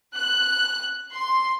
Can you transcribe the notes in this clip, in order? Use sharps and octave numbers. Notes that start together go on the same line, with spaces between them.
F#6
C6